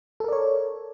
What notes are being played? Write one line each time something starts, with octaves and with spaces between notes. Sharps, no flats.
A4 A#4 C#5 D5